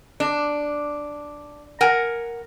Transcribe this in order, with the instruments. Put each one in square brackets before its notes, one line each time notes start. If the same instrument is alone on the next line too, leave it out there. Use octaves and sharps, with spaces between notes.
[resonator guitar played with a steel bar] D4
A#4 F#5 G#5